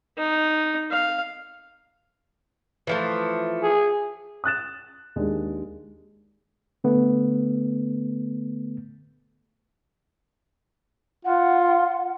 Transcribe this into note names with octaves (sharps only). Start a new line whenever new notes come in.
D#4
F5
E3 F3 A3
G#4
D#6 F#6 A6 E7
D#2 G#3 D4
D3 A3 B3
F4 F#5